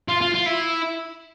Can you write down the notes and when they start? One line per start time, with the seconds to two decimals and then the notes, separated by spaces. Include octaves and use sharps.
0.09 F4
0.21 F4
0.35 F4
0.46 E4